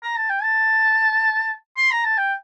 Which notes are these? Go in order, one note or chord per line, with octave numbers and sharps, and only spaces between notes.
A#5
A5
G5
A5
C6
A#5
A5
G5